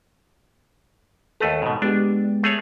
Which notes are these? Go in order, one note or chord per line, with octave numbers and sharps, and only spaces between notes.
D#2 A3 A4 B4
G#2 B2
G#3 B3 D4 G4
A3 G#4 C#5